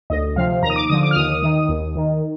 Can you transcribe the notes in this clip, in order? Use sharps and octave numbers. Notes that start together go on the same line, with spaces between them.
D2 D#5
C3 F3 F5
D#2 A#5
D#6
D6
D3 F3 D#6
D6
F6
D#2 D#6
D#3
D#2
D#3